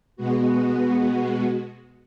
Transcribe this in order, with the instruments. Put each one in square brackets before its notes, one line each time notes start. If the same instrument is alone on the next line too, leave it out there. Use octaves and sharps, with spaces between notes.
[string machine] B2 G#3 B3 F#4